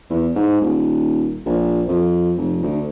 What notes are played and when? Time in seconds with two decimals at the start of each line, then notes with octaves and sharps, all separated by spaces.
0.10 E2
0.36 G#2
0.61 D#1
1.46 A#1
1.88 F2
2.38 F1
2.63 D2